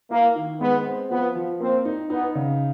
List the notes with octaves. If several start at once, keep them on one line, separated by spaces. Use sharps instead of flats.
A#3 E4
D#3
G#3 B3
C4
F3 B3
F3
A#3 C4
D#4
B3 D#4
C#3